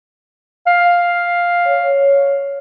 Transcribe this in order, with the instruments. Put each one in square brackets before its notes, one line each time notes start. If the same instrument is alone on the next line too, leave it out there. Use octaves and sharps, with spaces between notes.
[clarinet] F5
[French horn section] C#5